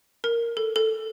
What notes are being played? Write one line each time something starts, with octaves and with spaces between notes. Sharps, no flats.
A#4
A4
A4